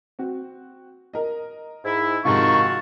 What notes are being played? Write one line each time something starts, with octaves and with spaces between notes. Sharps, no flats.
C4 F#4
A#4 D#5
G#2 E4
F2 G#2 C3 D#3 F4 F#4 A5 C#6